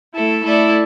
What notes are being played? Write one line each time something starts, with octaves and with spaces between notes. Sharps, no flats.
A3 E4 A4
A3 E4 A4 D5